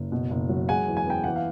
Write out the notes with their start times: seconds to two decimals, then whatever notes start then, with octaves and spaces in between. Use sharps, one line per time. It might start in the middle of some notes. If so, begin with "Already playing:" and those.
Already playing: F#1
0.12 B2
0.30 F#1
0.49 F#3
0.69 G#3 F#5 G#5
0.88 E2
0.97 G#5
1.07 B3 G5
1.24 E3 F#5
1.36 F5